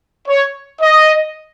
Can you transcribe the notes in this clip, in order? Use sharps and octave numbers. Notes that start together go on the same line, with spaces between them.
C#5
D#5